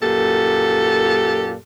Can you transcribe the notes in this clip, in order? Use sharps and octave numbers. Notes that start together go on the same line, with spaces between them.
F#2 A#2 G4 A4